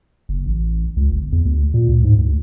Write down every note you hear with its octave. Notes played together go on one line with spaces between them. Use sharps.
F#1
A1
C#2
G1
E2
D2
A#2
D2
G#2
D2